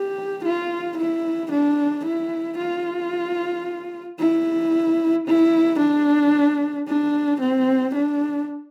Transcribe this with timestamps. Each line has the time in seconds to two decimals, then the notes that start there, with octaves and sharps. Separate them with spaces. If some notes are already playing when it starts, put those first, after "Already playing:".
Already playing: G4
0.45 F4
0.98 E4
1.52 D4
2.05 E4
2.59 F4
4.20 E4
5.27 E4
5.80 D4
6.88 D4
7.41 C4
7.95 D4